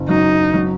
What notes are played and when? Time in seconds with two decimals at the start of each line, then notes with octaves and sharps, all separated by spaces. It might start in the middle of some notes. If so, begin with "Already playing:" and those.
Already playing: F#1
0.08 F#3 D#4
0.54 F#3